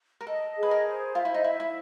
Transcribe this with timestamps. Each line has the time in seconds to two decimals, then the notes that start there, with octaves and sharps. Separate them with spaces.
0.21 A#4
0.27 A4 D#5
0.57 G#4
0.63 B4
0.71 A#4
0.86 C5
1.15 F4 E5
1.25 E4
1.34 D#4
1.44 E4 E5
1.60 E4